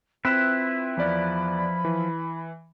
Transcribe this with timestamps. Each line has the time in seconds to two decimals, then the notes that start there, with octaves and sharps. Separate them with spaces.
0.25 C4 E4 F4 B4 E6 E7
0.97 E2 F3 D5 B5
1.85 E3